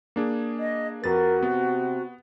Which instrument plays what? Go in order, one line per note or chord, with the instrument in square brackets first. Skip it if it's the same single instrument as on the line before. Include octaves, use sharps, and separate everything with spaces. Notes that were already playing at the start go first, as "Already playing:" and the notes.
[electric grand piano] A#3 D4 G#4
[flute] D#5
[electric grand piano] F2 B4 A6 [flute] F#4 [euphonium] A#4
[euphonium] C3 [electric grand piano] B3